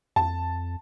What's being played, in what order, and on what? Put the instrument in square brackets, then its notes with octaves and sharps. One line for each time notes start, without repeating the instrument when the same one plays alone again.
[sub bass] F2 [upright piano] A5